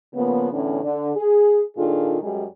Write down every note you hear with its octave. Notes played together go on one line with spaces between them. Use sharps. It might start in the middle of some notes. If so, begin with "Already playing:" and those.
C#3 F3 A#3 B3
E2 A2 D3 C#4
D3
G#4
A#2 D#3 D4 F4 G#4 A4
F#2 G3 G#3 G#4